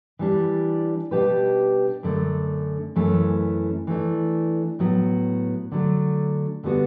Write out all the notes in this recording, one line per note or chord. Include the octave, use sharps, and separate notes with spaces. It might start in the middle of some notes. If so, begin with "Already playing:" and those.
E3 G3 D4
B2 G3 D4 G4 B4
F#2 D3 A3
F#2 E3 A3 C#4
E3 A3 D4
A2 F#3 B3
D3 F#3 A3
D3 G3 B3 F#4